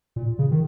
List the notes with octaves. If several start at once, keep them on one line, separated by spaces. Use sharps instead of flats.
A#2
C#3
D#3